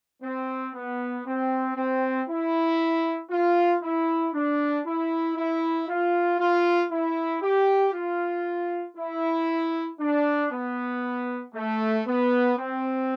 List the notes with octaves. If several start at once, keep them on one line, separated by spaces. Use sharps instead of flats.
C4
B3
C4
C4
E4
F4
E4
D4
E4
E4
F4
F4
E4
G4
F4
E4
D4
B3
A3
B3
C4